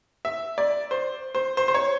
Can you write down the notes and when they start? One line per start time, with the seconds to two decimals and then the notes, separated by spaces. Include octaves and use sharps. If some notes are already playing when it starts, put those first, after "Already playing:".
0.25 E5
0.58 D5
0.91 C5
1.35 C5
1.57 C5
1.68 C5
1.74 C#5